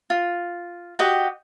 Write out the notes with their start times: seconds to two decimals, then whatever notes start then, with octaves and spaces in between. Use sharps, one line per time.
0.10 F4
0.99 F#4 G4 D#5 G5